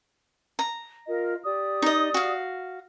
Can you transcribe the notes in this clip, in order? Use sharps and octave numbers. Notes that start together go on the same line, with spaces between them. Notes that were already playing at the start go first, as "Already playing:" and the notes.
A#5
F4 A#4 D#5
G4 D5 D#6
D#4 D#5
F#4 F5